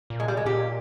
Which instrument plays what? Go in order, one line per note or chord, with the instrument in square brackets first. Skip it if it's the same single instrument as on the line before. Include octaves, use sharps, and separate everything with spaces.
[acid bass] A#2
[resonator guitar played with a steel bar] G#3
G3
G#3
[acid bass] A#2 [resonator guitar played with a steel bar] G4